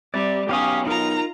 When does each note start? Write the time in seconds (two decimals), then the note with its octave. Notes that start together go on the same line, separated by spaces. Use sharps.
0.14 C3 G3 D5
0.49 B1 C#4 G4 F5 D#6
0.87 D#4 F4 A#4 A#5